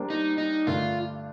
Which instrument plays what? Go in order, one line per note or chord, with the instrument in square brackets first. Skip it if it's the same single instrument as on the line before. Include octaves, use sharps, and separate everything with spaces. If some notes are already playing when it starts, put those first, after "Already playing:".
Already playing: [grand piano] G3 A#3 D4 G4 C5
[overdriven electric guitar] D#4
D#4
[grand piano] G2 D3 A3 D4 A4 [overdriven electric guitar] F4